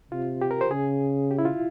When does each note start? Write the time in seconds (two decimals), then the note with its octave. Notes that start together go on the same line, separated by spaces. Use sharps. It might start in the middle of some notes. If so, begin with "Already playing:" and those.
0.11 C3 F4
0.41 G4
0.51 A#4
0.61 C5
0.71 C#3 G#4
1.31 G4
1.39 E4
1.45 F4